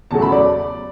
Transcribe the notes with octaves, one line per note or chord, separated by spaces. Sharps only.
E2 C#3 F#3 A3 A5
B5
D5